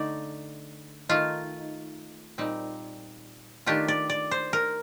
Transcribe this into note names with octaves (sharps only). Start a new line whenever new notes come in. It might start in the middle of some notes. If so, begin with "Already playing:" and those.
Already playing: D3 A3 D#4 D5
D#3 A3 D#4 F4
A#2 G3 C4 D#4
D#3 A3 D4 F4 G4
D5
D5
C5
A#4